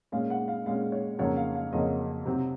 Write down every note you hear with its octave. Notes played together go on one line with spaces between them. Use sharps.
A#2 G#3 C#4 F5
F#5
F5
A#2 G#3 C#4 F5
C#5
F2 C#3 F#3 A#3 C#4 C#5
F5
F5
F2 C#3 F#3 A#3 C#4 D#5
C3 F#3 C4